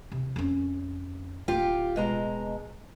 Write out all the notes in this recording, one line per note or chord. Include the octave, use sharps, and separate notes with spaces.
C3
F2 C#4
D1 F4 G4
B2 G#3 A#5